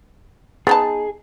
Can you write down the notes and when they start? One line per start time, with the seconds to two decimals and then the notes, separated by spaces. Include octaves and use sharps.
0.67 B3 D#4 G#4 A5